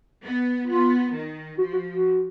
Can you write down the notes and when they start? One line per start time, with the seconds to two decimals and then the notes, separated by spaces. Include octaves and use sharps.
0.22 B3
0.67 B3 F4
1.13 D#3
1.58 F3 F#4
1.73 F#4
1.89 F#4